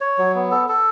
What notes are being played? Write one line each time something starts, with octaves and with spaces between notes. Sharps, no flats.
C#5
F#3
B3
A4
A4